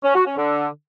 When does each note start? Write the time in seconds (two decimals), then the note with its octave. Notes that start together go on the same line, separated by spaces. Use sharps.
0.04 C#4
0.15 F#4
0.26 C#4
0.38 D3